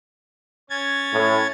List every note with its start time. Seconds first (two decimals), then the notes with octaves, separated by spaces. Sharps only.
0.70 C#4 G#6 A6
1.14 A2